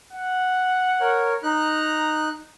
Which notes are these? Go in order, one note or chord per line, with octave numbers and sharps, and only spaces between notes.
F#5
A#4 C#5
D#4 A#5 F#6